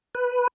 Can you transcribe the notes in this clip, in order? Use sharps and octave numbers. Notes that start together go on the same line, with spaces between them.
B4